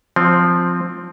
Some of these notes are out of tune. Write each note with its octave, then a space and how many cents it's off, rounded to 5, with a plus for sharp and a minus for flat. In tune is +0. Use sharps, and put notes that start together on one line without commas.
F3 +5 C4 +0